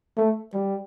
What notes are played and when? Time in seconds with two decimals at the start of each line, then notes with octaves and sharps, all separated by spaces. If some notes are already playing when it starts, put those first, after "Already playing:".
0.17 A3
0.54 G3